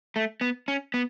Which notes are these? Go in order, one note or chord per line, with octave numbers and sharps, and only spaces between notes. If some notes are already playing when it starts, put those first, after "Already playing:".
A3
B3
C#4
B3